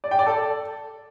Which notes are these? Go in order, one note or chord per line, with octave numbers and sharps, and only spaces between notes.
D5
G5
D5
A4